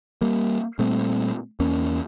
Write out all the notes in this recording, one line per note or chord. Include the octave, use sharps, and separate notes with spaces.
G3 A#3
A#2 G3 A3 C4
E2 A#3 C#4